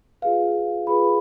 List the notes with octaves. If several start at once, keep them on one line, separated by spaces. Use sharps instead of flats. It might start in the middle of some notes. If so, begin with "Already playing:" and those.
F4 G#4 B4 F5
F4 G#4 B4 B5